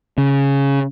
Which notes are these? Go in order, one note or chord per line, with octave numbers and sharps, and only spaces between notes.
C#3